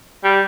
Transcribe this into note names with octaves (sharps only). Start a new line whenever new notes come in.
G3